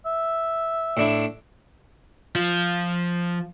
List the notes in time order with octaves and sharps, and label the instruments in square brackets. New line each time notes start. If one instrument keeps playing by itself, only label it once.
[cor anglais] E5
[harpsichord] A2 D4 E4
[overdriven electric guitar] F3